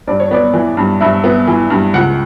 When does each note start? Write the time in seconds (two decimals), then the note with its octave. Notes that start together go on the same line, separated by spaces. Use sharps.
0.07 G2 D5
0.20 C#5
0.31 B3 D5
0.54 E3
0.77 G2
1.01 G2 E5
1.24 B3
1.47 E3
1.70 G2
1.94 C#2 F#5